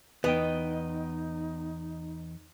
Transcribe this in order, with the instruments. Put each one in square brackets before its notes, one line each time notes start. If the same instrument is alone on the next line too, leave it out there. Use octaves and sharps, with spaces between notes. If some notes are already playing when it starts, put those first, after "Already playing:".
[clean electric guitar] E2 D#5 G5 [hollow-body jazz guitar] B3 [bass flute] D#4